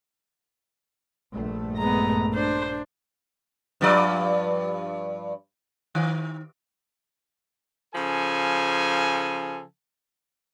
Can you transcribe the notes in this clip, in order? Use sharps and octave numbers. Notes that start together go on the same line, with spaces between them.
A#1 G2 A3
G#3 B3 A#5
D4 C5
G2 F3 D5
D#3
C#3 F3 A4 G#5